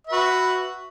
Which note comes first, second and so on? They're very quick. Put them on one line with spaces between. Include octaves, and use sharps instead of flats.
E5 B4 F#4